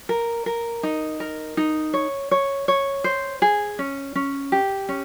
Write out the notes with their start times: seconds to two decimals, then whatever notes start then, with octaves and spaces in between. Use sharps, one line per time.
0.09 A#4
0.46 A#4
0.83 D#4
1.20 A#4
1.57 D#4
1.94 C#5
2.31 C#5
2.68 C#5
3.04 C5
3.42 G#4
3.79 C#4
4.15 C#4
4.52 G4
4.89 C#4